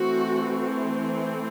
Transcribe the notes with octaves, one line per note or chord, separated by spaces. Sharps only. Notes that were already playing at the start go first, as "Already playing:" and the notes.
Already playing: E3 A3 C4 F#4